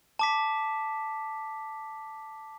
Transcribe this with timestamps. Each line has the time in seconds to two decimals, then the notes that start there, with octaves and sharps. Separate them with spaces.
0.19 A5 D6 B6